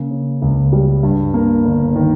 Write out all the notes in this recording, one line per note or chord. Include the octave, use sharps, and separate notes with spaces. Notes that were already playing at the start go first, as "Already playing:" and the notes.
Already playing: C#3 A#3
C#4
C#2
G3
G2
A#3
G1
D#3